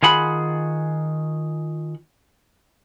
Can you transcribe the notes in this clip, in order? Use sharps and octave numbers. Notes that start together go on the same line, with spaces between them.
D#3 F4 G#4 F#5 B5